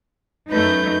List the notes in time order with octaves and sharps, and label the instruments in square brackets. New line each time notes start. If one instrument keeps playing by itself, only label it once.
[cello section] F#2 A3 D#4 [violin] B4 G6